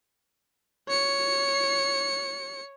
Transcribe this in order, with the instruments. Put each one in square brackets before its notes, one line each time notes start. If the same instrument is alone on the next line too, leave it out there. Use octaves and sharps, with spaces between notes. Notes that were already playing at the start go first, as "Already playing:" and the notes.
[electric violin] C#5 C#7